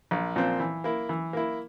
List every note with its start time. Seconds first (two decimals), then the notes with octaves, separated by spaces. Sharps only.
0.11 A#1
0.36 A#2 F3 C4
0.60 E3
0.84 A#3 E4
1.09 E3
1.33 A#3 E4